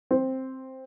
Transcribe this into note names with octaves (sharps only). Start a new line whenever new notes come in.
C4